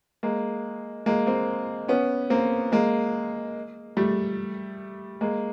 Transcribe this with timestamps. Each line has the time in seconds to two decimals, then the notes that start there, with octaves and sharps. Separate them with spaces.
0.23 G#3 A#3
1.06 G#3 A#3
1.27 A#3 C4
1.88 B3 C#4
2.30 A#3 C4
2.72 G#3 A#3
3.97 G3 A3
5.21 G#3 A#3